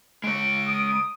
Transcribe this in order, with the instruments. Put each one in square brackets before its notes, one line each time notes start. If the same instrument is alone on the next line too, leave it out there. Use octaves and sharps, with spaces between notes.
[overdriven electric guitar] G#3 C#5 [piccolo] D7
[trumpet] D#6